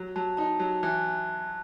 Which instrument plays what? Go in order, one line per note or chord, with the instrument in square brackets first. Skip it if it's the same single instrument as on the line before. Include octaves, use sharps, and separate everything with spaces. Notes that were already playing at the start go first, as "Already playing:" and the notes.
Already playing: [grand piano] F#3
[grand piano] F#3 [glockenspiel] A5
[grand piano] D#4 [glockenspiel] A5
[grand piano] F#3
[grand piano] E3 [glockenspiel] F#6